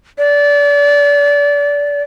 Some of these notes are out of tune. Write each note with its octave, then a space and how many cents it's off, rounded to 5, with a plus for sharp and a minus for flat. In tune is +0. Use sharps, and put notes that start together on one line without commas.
D5 -30